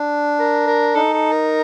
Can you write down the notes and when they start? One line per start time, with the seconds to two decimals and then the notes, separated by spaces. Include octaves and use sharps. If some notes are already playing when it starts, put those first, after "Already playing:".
Already playing: D4
0.39 A#4
0.67 A#4
0.95 D#4 A4
1.13 A4
1.31 A#4